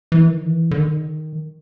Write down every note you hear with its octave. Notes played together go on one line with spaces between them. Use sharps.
E3
D#3
E3
D3
D#3